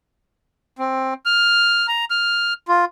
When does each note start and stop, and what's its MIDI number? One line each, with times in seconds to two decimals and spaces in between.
0.79 1.14 60
1.25 1.87 89
1.88 2.05 82
2.10 2.54 89
2.68 2.85 65